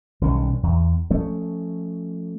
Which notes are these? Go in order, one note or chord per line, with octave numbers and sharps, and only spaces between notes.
B1 D#3 G3 C#4
E2
F3 A3 C#4